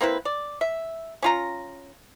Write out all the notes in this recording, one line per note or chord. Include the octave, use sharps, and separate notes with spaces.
A#3 C4 E4 B4
D5
E5
C#4 F4 A#5